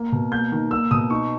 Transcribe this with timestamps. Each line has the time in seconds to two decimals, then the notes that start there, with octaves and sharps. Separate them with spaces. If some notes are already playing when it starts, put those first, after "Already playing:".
Already playing: A#3
0.12 B2
0.32 A#3 G6
0.52 D#3
0.71 A#3 E6
0.91 B2 D#6
1.10 D#4 C#6